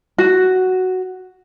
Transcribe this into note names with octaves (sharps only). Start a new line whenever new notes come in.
F#4